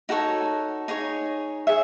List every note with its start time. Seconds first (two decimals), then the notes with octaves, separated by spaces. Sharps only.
0.09 D#4 F#4 A4 C#5
0.88 D#4 G#4 C#5
1.67 G#4 C#5 E5